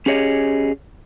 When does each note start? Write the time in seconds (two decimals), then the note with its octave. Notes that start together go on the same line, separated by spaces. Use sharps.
0.06 C#4 G4 G#4 C#5 D#5